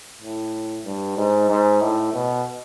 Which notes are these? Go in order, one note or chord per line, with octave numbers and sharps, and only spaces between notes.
A2
G2
G#2
G#2
A2
B2